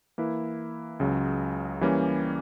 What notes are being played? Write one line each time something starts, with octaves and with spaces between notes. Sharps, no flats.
E3 A#3 E4 B4
C#2 C#3 F#3
E3 G3 A#3 C#4